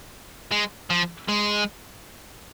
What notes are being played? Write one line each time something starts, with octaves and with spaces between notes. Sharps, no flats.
G#3
F3
G#3